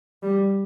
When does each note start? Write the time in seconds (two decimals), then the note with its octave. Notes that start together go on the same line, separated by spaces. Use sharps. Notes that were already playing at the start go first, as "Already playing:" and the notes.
0.23 G3